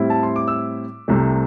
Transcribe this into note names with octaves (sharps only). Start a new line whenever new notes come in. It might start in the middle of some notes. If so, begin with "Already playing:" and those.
Already playing: A2 G3 C4 E4
A5
C6
D6
E6
C2 C3 A3